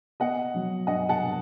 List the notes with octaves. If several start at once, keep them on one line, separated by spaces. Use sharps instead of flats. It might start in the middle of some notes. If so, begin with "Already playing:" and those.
B3 D#5 F#5
F#3
G2 D#5 F#5
F#5 A5